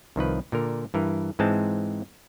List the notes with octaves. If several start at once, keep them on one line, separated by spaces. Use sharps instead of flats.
C2 D#3 F3 B4
A#2 D3 A#4
G2 E3 A#4
G#2 E3 G#3 C4 A5